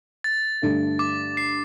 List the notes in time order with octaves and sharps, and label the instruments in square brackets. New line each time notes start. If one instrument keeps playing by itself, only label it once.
[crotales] A6
[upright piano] G2 D3 A3
[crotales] D6
C7